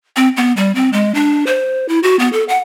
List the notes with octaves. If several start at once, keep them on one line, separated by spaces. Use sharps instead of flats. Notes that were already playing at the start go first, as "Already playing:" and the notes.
C4
B3
G3
C4
G#3
D4
C5
E4
F#4
B3
A4
F#5